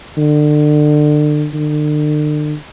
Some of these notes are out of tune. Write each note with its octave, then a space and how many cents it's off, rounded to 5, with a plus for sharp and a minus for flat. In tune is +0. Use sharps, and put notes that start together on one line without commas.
D3 +30
D3 +40